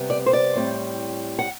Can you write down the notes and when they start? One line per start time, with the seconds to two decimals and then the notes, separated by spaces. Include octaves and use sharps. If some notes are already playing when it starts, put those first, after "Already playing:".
Already playing: C3 G3 B3
0.10 D5
0.26 C5
0.33 D5
0.55 A2 G3 C4
1.39 F#5